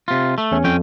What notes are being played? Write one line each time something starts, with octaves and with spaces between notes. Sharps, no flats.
C3 F4
A3
E2 C#4
F2 C#4 G5